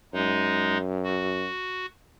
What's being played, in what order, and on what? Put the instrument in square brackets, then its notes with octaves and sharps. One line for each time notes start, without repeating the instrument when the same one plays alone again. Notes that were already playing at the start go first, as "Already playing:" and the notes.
[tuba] F#2 [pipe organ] G#3 D#4
[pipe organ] F#4